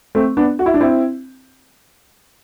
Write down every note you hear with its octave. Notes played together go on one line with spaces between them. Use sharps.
A3 C4
B3 D4
F#4
E4
D4
C4 E4